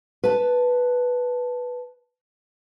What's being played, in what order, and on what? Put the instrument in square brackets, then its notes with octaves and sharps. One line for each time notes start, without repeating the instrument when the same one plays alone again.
[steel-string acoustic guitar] B4 A5